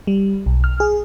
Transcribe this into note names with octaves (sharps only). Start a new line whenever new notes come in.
G3
B1
F6
G#4